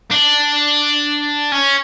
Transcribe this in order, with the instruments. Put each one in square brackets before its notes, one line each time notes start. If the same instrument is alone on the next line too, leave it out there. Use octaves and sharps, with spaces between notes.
[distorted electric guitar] D4
C#4